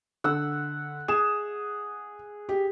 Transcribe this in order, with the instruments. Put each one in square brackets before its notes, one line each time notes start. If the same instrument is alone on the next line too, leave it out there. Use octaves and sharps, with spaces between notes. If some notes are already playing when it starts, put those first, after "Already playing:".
[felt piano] D3 [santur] F#5 E6
[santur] G#4 [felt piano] E7
[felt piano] G4